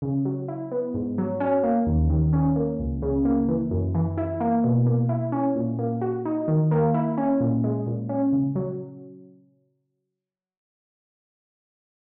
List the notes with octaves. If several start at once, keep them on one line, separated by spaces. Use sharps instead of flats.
C#3
F#3
E4
B3
G#2
F#3
C#4
A#3
D#2
D#3
C#4
A#3
C#2
C#3
A#3
E3
F#2
E3
E4
A#3
B2
A#3
E4
C#4
A#2
A#3
F#4
D#4
D#3
A#3
E4
C#4
A#2
G#3
A#2
C#4
C#3
F#3